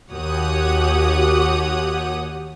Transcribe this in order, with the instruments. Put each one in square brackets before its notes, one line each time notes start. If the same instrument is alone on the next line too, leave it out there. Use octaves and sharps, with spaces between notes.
[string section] D#2 F#4 G4 C#5 F#5 D#6